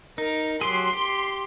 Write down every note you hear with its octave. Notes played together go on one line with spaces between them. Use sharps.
D#4 A#4
F#3 G4 G#4 C6
G4